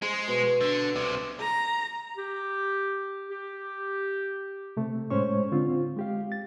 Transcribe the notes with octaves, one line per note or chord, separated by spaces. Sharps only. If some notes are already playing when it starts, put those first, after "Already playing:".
G#3 C5
B2
D3
C2 C3
A#5
G4
G4
C3 A3
A2 G#3 C#4 C5 C#5 C#6
D3 C4 F4
G#3 G4 F5
A6